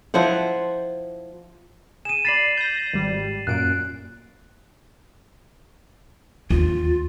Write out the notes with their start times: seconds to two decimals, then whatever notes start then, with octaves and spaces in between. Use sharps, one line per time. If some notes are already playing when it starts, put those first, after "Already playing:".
0.14 F3 E4 C5 F#5
2.05 G#4 D#7 E7
2.25 D5 B5 A6 C7 F#7
2.57 G6 A#6
2.93 G#1 G3
3.47 F#2 A#2 F#6 D7
6.51 D#2 F4